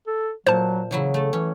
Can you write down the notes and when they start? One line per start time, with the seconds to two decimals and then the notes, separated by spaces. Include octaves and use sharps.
0.07 A4
0.47 A#2 F#3 C5 A5
0.91 C#3 E3 F#3 E4
1.14 A3 A4
1.33 E3 C#4